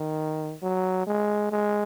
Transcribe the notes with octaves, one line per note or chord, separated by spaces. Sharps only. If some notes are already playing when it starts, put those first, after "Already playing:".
Already playing: D#3
F#3
G#3
G#3